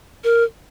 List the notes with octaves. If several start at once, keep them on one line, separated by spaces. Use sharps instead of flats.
A#4